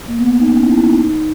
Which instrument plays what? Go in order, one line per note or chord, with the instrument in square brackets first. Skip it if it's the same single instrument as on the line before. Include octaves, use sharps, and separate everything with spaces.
[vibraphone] A#3
B3
D#4
C#4
E4
E4
D#4